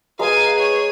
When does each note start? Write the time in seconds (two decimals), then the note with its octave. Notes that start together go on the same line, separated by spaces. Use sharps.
0.19 G#3 B4 F5 G#5 A#5 D#6
0.54 G#4 C#5